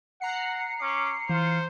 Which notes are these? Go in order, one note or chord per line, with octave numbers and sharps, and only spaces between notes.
F#5 A#5 C7 C#7
C#4 D6
E3 F4 C5